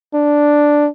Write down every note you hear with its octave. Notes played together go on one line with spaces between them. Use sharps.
D4